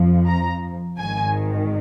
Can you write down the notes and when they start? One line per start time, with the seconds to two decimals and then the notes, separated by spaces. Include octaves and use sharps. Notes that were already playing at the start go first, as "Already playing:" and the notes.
Already playing: F2 F3
0.26 A#5
0.98 G#1 G#2 D#3 G#5